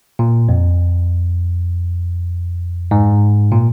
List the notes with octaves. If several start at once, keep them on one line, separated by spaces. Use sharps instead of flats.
A#2
F2
G#2
A#2